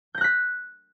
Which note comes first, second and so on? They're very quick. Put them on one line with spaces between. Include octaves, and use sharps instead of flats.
G6 A#6 F#6 B6